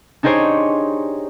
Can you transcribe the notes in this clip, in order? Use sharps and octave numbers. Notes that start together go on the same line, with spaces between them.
D4 D#4 G4 G#4 C5 C#5